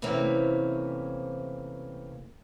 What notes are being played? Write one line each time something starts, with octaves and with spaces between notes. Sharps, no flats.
C3 E3 A3 A#3 C4 C#4